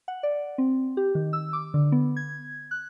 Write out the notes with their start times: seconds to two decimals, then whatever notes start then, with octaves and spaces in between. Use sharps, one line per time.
0.08 F#5
0.23 D5
0.58 C4
0.97 G4
1.15 D#3
1.33 E6
1.53 D6
1.74 D3
1.92 B3
2.17 G#6
2.71 F#6